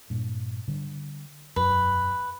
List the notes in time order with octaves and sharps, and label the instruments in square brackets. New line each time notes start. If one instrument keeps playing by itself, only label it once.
[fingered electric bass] G2 A#2
D3 G3
[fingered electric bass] E1 F#2 F#3 [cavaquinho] B4